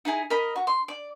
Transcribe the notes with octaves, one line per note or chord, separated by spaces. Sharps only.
D#4 E4 G#4 A#5
A#4 D#5 B5
F#4
C6
D5